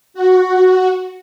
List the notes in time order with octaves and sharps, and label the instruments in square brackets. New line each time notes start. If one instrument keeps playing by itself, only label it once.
[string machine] F#4